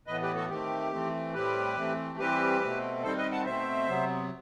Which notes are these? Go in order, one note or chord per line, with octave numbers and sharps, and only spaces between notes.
A2 E3 B3 B4 D#5
G4 B4
F#4 A4
D#3 A3 C4 G4
E3 A3 C4
A2 G3 C4 G4 B4
E3 A3 C4
E3 G3 C4 G4 B4
B2 A3 C4
D#3 G3 C4 A4 C5
B4 D#5
F#5 A5
B2 A3 C4 C5 E5
C3 F#3 B3